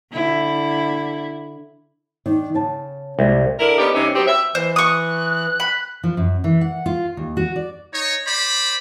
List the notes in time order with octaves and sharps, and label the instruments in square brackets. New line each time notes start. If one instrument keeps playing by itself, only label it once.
[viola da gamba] D3 E4
[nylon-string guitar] D#3 D4
C#3 G5 A5
[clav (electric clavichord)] C2 [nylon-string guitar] G#3 G4 A#4
[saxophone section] D3 E4 A#4
B3 C#4 D#4 G4 D5
G2 C3 E3 C#4 D#4
F#3 B3 C4 G4
E5
[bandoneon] E3 [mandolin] C5
[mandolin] C#6 D#6 [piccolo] F#6
[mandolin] B5
[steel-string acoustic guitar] F3
F#2
E3
F#5
F4
D#2
F#4
D5
[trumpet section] D#4 C#5
C5 D5 B5